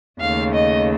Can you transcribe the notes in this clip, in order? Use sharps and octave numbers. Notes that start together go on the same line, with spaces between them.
D#2 C#3 A3 F5
D#5